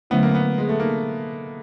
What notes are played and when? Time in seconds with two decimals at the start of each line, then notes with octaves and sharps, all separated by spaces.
0.10 D3 F#3 A3 B3 C#4 E4
0.23 A#3
0.35 B3
0.58 G#3
0.69 A3
0.79 A#3 B3 D#4 G#4